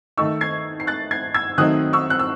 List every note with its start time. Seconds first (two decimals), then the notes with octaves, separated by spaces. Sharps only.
0.17 D#3 A3 D#4 C#6 E6
0.41 G#6 C7
0.80 C7
0.87 F#6 A6
1.11 G#6 C7
1.34 E6 G#6
1.58 D#3 F#3 A3 C4 D#4 D#6 F#6
1.93 C#6 E6
2.10 F#6
2.19 E6